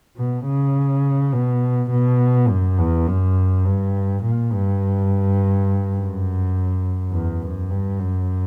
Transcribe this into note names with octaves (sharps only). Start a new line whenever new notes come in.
B2
C#3
B2
B2
F#2
E2
F#2
G2
A#2
G2
F#2
E2
F#2
G2
F#2